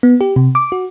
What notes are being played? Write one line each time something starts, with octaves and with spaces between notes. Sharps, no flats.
B3
G4
C3
D6
F#4